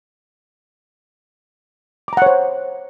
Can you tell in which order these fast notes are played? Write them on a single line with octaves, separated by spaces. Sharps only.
D6 A#5 F#5 C#5 C5